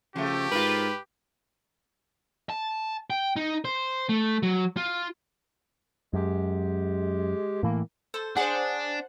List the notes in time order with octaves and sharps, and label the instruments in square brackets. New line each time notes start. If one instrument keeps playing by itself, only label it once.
[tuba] C#3 [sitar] F3 A3 [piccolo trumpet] G4
[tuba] G#2 [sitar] F4 A#4 [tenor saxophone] B4
[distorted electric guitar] A5
G5
D#4
C5
A3
F#3
F4
[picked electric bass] F#2 [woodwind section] G#3 G4
[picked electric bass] A2 E3 [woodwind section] A#3
[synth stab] A4 [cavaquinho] C5
[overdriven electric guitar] D4 [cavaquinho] G#4 [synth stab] C5 F#5